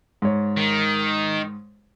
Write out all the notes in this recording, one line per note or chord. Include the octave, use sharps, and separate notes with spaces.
G#2 C#5
D#3